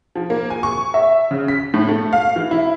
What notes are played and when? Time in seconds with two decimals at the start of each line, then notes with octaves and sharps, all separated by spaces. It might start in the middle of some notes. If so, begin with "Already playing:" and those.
0.16 F3
0.30 A#3
0.50 G#5
0.63 C#6
0.94 E5
1.31 C#3
1.48 B6
1.74 A2
1.88 A3
2.13 F5
2.36 E3
2.51 E4